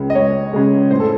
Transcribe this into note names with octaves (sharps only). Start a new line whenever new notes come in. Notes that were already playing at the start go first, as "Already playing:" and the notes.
Already playing: C#2 C#3 G#3
D#5
C#2 C#5
C#3 G#3
A2 C5
A4